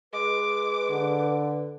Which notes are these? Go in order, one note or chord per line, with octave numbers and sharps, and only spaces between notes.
G#3 B4 D6
D3